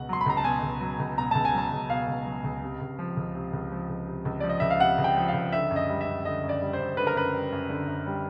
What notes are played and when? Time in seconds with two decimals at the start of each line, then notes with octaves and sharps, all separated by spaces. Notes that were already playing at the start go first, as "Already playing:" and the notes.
Already playing: C#2 B2 F#5
0.09 F#3 C6
0.21 B5
0.26 C#2 A#5
0.37 A5
0.44 B2 G#5
0.62 C#2
0.81 F#3
1.00 C#2
1.18 B2 A#5
1.31 C#2 A5
1.45 G#5
1.54 F#3 A5
1.72 C#2
1.90 B2 F5
2.08 C#2
2.26 F#3
2.44 C#2
2.63 C3
2.81 C#2
2.99 F3
3.17 C#2
3.35 C3
3.53 C#2
3.72 F3
3.89 C#2
4.07 C3
4.25 C#2
4.40 F3 D5
4.49 D#5
4.60 C#2 E5
4.70 F5
4.80 C3 F#5
4.98 C#2
5.04 G5
5.17 F3
5.28 F5
5.34 C#2
5.52 D3 E5
5.71 F#2
5.76 D#5
5.89 G3
6.01 E5
6.07 F#2
6.25 D3 D#5
6.44 F#2
6.49 D5
6.61 G3
6.73 C5
6.80 F#2
6.97 D3 B4
7.07 A#4
7.15 F#2 B4
7.34 G3
7.52 F#2
7.69 D3
7.88 F#2
8.07 G3